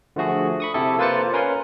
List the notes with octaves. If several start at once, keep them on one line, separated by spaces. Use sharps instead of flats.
D3 F3 A3 F#4 G#4
B5 C#6 D#6
C3 E4 G4 A4
A#3 F4 B4 C5 A6 C#7
C#4 A#4 B4 G#5 C6